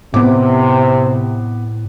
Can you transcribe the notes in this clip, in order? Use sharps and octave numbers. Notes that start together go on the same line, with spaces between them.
A2 C3 B3 D6